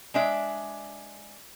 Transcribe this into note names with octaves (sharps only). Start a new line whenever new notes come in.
G#3 D4 E5